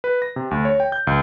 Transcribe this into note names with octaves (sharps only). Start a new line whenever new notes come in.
B4
A#6
C3
D2
C#5
G5
G6
C#2